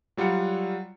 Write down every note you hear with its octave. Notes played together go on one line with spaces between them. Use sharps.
F#3 G3 F4 F#5 C#7